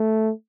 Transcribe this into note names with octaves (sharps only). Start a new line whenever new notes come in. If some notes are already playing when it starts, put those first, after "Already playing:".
Already playing: A3